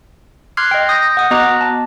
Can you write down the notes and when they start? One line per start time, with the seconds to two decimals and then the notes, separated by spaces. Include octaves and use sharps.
0.57 C6 D6 F6 F#6 G#6 C7
0.71 D#5 G5
0.89 D#6 G6 A#6
1.17 F#5 D#6
1.31 B3 F#4 D#5 A#5 D6 F#6
1.61 A5